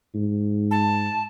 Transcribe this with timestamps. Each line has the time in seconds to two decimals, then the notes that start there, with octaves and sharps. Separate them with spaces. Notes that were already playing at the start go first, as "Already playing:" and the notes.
0.14 G#2
0.71 A5